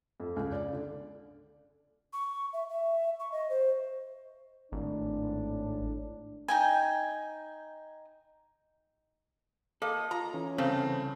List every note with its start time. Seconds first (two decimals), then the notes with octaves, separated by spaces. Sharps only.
0.20 F2
0.36 C#2
0.52 D5
0.73 D3
2.13 C#6
2.53 E5
2.69 E5
3.20 C#6
3.32 D#5
3.50 C5
4.72 G#1 A2 D4
6.48 D#4 G5 G#5
9.82 A#3 A4 D#5
10.11 F4 A#5
10.34 E3 C#4
10.58 C2 C#3 C4 A4